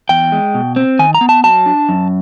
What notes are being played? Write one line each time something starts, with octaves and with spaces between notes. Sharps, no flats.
E2 G5
G#3
B2
C4
D#3 G#5
A#5
B3
A5
F#3 A5
D4
F#2